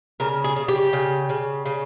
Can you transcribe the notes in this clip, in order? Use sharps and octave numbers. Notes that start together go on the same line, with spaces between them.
C#3 A#4
G#4
C#3
G4
C#3
C#3
C#3